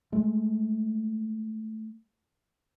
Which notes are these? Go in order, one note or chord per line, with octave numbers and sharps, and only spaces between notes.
G#3 A3